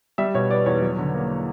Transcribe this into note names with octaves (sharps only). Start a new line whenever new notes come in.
G3 E5
B2 C#5
B3 D5
E2 C#5
F#3
D3
A#3